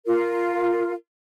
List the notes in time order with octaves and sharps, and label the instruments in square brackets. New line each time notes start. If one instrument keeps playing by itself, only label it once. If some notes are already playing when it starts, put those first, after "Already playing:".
[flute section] F4 A#4